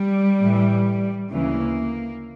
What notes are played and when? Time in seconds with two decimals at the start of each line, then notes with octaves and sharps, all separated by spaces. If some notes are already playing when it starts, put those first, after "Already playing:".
Already playing: G3
0.42 A2 E3
1.31 D2 C#3 E3 A#3